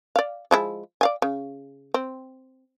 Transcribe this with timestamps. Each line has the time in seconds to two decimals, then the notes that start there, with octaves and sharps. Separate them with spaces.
0.16 D5 F5
0.51 F3 G#3 E4
1.01 D5 F5 G#5
1.22 C#3
1.94 C4